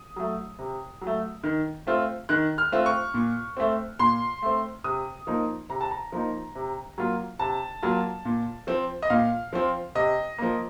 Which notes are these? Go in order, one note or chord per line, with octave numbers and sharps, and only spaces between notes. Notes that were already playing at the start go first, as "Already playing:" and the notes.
Already playing: D#6
F#3 A3
C3
F#3
A3
D#3
A3 C4 F4
D#3 F#6
F6
A3 C4 F4
C#6
A#2
A3 C4
A#2 C6
A3 C4
C3 D#6
F3 A#3 D#4
C3 A#5
A5
A#5
F3 A#3 D#4
C3
F#3 A#3 F4
C3 A5
F#3 A#3 F4
A#2
F3 C4
D#5
A#2 F5
F3 C4
C3 D#5
F3 A#3